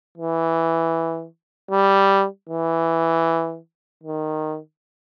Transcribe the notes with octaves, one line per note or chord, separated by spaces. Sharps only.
E3
G3
E3
D#3